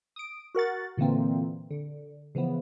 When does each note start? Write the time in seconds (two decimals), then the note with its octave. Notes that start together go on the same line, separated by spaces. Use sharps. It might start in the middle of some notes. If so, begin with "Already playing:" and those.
0.16 D#6 D7
0.55 F#4 A#4 F#5 A6
0.97 A#2 D3 E3 A#3 C4
1.71 D3
2.35 C#3 E3 F3 B3